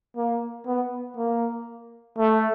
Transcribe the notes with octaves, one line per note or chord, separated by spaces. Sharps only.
A#3
B3
A#3
A3